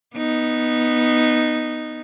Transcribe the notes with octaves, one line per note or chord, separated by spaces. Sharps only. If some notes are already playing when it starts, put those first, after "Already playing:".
B3 D#4